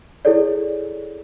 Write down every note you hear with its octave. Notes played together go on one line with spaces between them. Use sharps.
E4 G#4 A4 C#5 D5